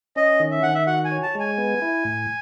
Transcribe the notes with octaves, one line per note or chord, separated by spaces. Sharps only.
C#4 D#5
D#3
E5
D#3 F#5
E5
F#4 F#5
G#5
C#5
A5
G#3 G#5
B3
E4
A2